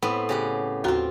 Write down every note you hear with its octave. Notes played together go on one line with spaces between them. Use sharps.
A2 B3 C4
C#3 G4 F#5
D#2 C4 F4 F#4 A#5